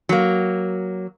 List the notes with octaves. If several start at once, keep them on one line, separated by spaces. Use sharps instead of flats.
F#3 A#3